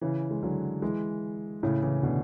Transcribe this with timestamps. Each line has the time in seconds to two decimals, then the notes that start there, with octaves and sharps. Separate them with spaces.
0.01 C#3 E3
0.31 G#3
0.43 D3 F#3
0.82 E3 G#3
1.63 A2 C#3
1.82 C#3 E3
2.03 B2 D3